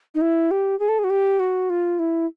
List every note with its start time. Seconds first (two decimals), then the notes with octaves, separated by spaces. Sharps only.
0.15 D#4
0.21 E4
0.51 G4
0.79 G#4
0.89 A4
0.99 G#4
1.04 F#4
1.10 G4
1.39 F#4
1.70 F4
1.99 E4